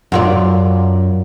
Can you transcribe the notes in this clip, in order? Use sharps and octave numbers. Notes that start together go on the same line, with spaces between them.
F#2 F4 D5